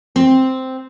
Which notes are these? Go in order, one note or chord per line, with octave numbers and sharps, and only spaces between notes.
C4